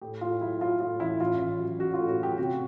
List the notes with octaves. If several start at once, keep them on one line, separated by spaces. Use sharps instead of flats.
A2 G4
A2 F4
F#3 E4
F#3 F4
A2 F4
A1 E4
A1 F4
A1
F#3
A1 F#4
F4
A2
F#4
F#3 G4
C3 F#4